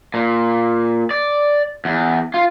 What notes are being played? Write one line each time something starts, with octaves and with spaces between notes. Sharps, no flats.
A#2
D5
E2
F4